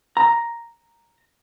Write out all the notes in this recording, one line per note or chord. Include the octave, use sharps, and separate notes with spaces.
A#5